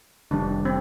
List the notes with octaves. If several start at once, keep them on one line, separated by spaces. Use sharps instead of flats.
F1 D#3 G3 D4
C4